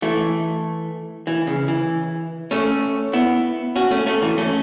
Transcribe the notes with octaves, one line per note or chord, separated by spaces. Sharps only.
E3 A3
E3
C#3
E3
A3 C#4
B3 E4
C#4 F#4
A3 C#4
A3 C#4
E3 A3
A3 C#4